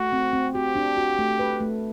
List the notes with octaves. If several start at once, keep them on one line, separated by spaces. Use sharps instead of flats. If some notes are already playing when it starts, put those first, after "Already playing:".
Already playing: A3 F#4
C4
C4
F#4 G4
D4
F#4
A3
B4
A3